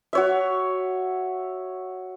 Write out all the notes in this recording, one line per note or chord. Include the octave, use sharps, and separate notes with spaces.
F#4 C#5 E5